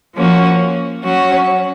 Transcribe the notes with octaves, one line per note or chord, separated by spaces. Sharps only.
F3 A#3 C#4 F#4
F#3 C#4 F#4